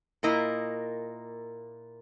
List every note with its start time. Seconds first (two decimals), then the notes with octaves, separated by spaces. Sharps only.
0.23 A#2 A#3 E4 A#4 D#5